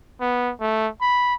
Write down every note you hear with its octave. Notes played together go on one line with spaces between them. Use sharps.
B3
A3
B5